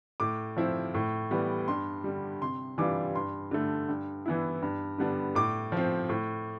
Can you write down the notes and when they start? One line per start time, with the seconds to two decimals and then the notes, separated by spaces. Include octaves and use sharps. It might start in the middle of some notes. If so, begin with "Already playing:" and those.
0.20 A2 D6
0.56 F3 C4 E4
0.95 A2
1.31 E3 G3 B3
1.68 G2 C6
2.04 D3 G3
2.42 C3 C6
2.78 E3 G3 D4 F4 D6
3.15 G2 C6
3.51 D3 A3
3.89 G2
4.26 E3 B3 E4
4.62 G2
4.98 D3 G3 B3 D4
5.35 A2 D6
5.72 F3 C4
6.09 A2